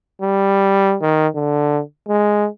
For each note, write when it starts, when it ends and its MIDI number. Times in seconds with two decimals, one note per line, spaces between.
0.22 0.96 55
1.01 1.28 51
1.35 1.81 50
2.08 2.48 56